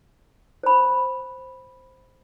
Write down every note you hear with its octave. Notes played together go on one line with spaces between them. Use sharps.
C5 B5